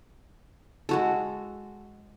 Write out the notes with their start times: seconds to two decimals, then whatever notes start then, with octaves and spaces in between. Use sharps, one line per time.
0.89 G#3 F#4 A4